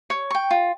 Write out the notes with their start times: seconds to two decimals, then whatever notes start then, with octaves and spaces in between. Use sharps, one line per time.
0.10 C#5
0.30 G5 C#6
0.51 F4